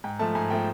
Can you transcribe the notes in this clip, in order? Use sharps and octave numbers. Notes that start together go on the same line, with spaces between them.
G#2 G5
F3 A3 A5
G#2 G#5
F3 A3 G5